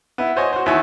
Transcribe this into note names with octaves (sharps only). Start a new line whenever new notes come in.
B3 E4
F#4 C5 C#5 D#5 G#5
F#4 C5
D#2 E3 F#4 E5 G#5